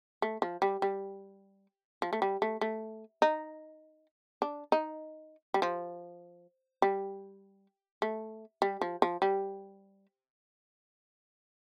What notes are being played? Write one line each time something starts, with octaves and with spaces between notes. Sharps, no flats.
A3
F3
G3
G3
F3
A3
G3
A3
A3
D#4
D4
D#4
G3
F3
G3
A3
G3
F3
F3
G3